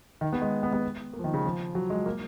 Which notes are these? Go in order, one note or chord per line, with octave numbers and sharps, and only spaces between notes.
D#3
B3
G#3
B3
B3
A#3
F3
D#3
C#3
F3
F#3
G#3
A#3